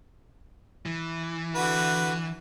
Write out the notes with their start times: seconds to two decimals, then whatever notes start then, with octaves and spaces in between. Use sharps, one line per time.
0.86 E3
1.55 D3 F#4 B4